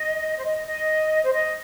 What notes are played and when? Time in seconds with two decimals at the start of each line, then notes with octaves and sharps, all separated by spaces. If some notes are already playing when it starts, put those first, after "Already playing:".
Already playing: D#5
0.38 C5
0.44 D#5
0.66 D#5
1.23 C5
1.33 D#5